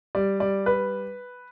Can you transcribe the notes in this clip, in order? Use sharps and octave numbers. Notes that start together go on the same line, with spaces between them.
G3 D5
G3 D5
B4